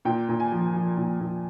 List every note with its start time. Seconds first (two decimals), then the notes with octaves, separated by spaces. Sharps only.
0.05 A#2 G5
0.29 A#2
0.40 G#5
0.52 F3
0.74 F3
0.97 A#2
1.20 A#2